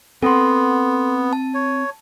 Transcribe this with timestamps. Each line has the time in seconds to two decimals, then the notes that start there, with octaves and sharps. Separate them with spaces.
0.22 B3 C4 A4 F#5 C6
1.33 A5
1.54 C#5